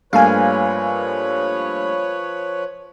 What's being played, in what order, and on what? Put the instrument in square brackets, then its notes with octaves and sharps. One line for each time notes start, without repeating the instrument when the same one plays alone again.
[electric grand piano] G2 A3 A#3 [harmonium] F3 B4 C#5 [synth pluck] F5 G#5